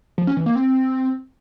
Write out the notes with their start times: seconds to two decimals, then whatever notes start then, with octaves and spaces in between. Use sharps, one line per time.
0.18 F3
0.27 C#4
0.37 E3
0.46 A#3
0.56 C4